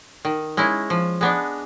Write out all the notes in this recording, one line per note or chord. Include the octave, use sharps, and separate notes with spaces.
D#3
G#3 C#4 E4
F3
G#3 B3 D4